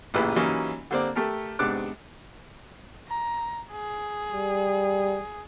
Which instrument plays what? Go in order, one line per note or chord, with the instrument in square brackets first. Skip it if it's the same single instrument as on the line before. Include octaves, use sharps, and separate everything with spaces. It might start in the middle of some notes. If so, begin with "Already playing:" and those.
[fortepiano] A1 A#2 C#3 E4 G4 B4
E3 F#3 G3 A#3 C#4 D#4
D3 G3 A#3 C4 D5
A3 G4 A4 A#4
G#2 C3 B3 D4 D6 F#6
[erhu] A#5
G#4
[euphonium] G3